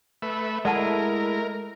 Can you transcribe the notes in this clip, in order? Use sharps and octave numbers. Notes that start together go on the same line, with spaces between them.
A3 B4 E5
G#3 A3 E4 A#4 D5 F#5 A5